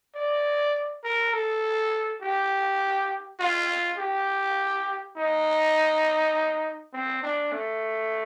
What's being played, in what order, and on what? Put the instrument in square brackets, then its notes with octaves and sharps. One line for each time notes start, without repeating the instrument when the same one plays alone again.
[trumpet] D5
A#4
A4
G4
F4
G4
D#4
C4
D4
A3